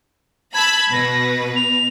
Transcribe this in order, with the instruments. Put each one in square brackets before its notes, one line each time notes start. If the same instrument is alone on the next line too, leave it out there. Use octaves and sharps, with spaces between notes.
[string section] A5 B5 E6 [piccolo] G#6
[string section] B2 B4 [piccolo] A#6
[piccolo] F7